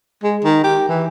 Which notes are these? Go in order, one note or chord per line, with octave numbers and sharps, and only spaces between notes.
G#3
D#3
G4
E3